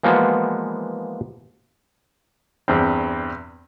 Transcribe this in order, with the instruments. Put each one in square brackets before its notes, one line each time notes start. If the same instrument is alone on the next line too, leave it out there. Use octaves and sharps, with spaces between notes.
[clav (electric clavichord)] E3 F3 G#3 A#3 B3 F#4
[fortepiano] E2 G2 C4